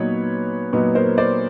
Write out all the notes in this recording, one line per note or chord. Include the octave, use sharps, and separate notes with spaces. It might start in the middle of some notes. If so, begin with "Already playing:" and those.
Already playing: A#2 F#3 B3 D#4 B4 C#5
A#2 F#3 B3 D#4
A#4 C5
C5 D5